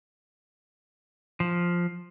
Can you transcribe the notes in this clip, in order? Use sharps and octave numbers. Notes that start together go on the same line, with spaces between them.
F3